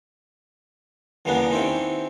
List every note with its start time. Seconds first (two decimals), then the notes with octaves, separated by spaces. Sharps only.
1.25 E2 C#3 G3 A#3 B3 D4
1.51 D#3 C4 C#4 E4 G4